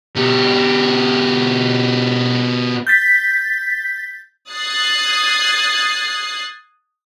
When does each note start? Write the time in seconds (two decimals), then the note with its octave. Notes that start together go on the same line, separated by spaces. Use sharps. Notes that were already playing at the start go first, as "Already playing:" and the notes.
0.16 B2 G4
2.87 G6 A6 B6
4.49 D#6 F#6 G#6 A6 C7